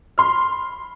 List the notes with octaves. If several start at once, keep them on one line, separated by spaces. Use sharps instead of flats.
B5 C6 F6